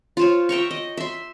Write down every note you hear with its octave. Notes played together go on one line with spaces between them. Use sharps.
F4 C5 C#5
E5 G5 A#5 C#6
D#5
E5 C6